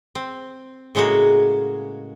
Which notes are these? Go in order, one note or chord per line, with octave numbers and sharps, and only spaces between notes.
C4
A2 C#3 G#3 A#3 F#4